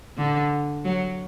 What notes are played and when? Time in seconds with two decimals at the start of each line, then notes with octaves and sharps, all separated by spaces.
0.17 D3
0.85 F#3